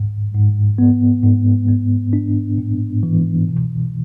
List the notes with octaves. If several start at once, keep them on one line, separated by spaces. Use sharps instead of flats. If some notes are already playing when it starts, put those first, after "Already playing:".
Already playing: G#2
G#2
B3
G#2
B3
D4
A2
E3
B2